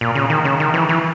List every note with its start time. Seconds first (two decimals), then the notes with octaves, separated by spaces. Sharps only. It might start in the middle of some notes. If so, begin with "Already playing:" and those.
0.01 A#2
0.15 C#3
0.30 D#3
0.45 C#3
0.60 D#3
0.74 E3
0.89 E3